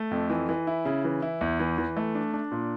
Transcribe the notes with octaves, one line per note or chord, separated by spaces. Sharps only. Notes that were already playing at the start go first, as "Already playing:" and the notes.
Already playing: A3
F2
E3
E3
E4
C#3
E3
E4
E2
E3
E3
A3
D4
D4
A#2